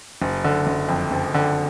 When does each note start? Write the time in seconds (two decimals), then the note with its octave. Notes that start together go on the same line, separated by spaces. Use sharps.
0.22 F#1
0.44 D3
0.67 F#1
0.89 F2
1.11 F#1
1.34 D3